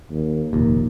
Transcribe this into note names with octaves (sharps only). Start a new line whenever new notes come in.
D#2
F1 D#2 A#2